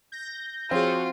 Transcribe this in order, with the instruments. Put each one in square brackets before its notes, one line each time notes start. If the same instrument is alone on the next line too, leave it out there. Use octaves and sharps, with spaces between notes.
[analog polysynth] G6 A#6
[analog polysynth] F3 F#4 [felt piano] C4 [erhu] F4 [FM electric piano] G#4 C#5